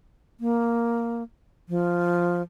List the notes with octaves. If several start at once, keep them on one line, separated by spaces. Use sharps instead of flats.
A#3
F3